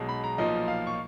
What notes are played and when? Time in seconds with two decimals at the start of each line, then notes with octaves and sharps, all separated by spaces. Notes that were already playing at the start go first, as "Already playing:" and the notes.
Already playing: B1 B2 G#3 D#4
0.09 B5
0.24 A#5
0.38 B1 A#2 F3 A#3 D#4 D#5
0.68 F5
0.87 C#6